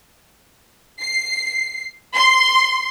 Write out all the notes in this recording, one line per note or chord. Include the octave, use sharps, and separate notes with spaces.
C7
C6